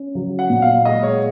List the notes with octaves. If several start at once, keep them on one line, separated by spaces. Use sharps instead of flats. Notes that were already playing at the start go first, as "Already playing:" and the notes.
Already playing: C#4
F#3
F#5
A#2
F5
G#3 D#5
C#5